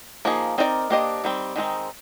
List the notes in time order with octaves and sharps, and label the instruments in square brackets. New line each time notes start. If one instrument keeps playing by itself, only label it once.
[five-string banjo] F3 A#3 D#4 G#4
C4 D#4 A#4 D5
A#3 D4 G4 C5 D#5
D#3 G3 C4
D#3 G#3 C4 D#4